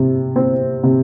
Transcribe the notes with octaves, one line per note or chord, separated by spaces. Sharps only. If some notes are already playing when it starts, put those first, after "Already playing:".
Already playing: C3
C4
C3